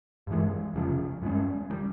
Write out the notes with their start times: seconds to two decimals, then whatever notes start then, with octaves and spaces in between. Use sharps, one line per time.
0.27 G2 E3 G#3
0.74 F1 E2 C#3 F3
1.22 G2 E3 G#3 C#4
1.70 D3 G3